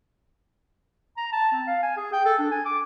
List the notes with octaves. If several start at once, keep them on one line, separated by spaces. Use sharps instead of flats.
A#5
A5
C4
F5
G#5
G#4
G5
A4
D4
G#5
D6